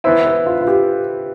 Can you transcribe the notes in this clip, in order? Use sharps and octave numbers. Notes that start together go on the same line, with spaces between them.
E3 B3 E4 C5
B4
F4
F4
G4